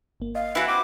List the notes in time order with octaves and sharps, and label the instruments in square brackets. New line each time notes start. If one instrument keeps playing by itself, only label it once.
[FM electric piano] G1 A#3
[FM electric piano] D#5 [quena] F5
[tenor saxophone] E3 [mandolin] E4 F#4
[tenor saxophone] C4 [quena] D6